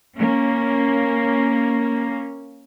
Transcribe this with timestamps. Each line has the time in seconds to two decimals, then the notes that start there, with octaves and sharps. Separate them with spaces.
0.18 A#3 C#4